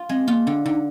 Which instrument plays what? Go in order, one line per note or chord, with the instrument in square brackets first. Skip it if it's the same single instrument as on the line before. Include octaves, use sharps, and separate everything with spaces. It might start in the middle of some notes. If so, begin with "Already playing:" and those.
Already playing: [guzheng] F4
[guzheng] G#3 [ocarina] C4
[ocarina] A#3 [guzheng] F4
[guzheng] D3 [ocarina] D4
[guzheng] D3 [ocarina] D#4